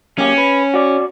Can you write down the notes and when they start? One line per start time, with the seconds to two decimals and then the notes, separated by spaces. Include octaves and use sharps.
0.18 F#2 A#3 C#4 G4
0.38 B4
0.74 F#4 D5